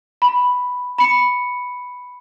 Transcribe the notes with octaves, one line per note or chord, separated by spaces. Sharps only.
B5
B5 C#7